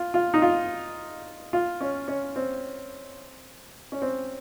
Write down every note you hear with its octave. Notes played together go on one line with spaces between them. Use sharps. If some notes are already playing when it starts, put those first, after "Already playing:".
Already playing: F4
F4
D#4
F4
F4
C#4
C#4
C4
C#4
C4